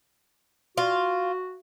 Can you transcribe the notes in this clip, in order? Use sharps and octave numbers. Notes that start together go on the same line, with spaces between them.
F4 F#4